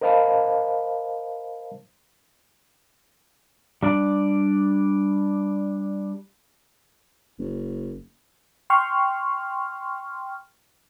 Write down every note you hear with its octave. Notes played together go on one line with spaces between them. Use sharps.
A#4 C5 D#5 F5 A5 B5
G3 D4 D5
F#1
G5 C6 C#6 F6